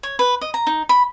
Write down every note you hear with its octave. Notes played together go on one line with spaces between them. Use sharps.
C#5
B4
D#5
A#5
D#4
B5